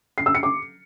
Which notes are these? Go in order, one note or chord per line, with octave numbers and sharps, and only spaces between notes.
C7
E6
C#7
D6